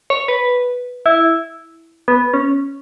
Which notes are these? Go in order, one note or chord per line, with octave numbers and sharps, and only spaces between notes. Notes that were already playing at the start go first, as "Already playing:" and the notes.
C#5
B4
E4
B3
C#4